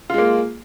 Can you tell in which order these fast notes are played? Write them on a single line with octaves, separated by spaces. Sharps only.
F4 G#3 A#3